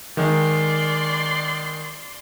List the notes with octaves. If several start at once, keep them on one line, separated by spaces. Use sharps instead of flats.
D#3 G#3 D5 C6